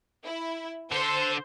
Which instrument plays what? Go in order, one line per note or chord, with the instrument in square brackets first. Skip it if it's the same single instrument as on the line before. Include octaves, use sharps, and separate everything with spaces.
[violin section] E4
[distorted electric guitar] D3 A4 [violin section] C5